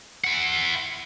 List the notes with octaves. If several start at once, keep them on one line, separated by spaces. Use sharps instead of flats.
E4 F#5